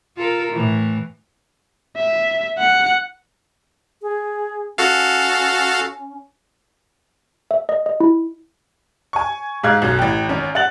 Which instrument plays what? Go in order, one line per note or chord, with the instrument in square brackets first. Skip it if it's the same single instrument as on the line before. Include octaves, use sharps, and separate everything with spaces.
[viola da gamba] F4 A4 A#4
A2 E3
[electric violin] E5
F#5 C#7
[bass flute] G#4
[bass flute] C#4 [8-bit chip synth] F#4 A4 F5
[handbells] E5
D#5
D#5
E4
[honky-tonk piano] G#5 C#6
G#2 G#3 F5 F#6 G#6
B1 F#2
A1 G5
G#1 C#4
F#5 F#6 A6 F#7